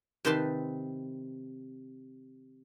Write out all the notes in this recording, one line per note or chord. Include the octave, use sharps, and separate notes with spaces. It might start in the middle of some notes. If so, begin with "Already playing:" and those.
C3 D#3 C4 B4 A5 C6